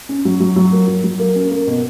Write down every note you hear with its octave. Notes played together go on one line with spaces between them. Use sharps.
C#4
F#3
F#3
F#3
A#3
F#3
F#3
A#3
C#4
A#3
B2